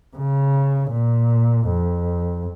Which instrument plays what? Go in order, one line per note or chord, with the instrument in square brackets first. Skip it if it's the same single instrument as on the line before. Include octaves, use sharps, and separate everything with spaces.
[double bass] C#3
A#2
F2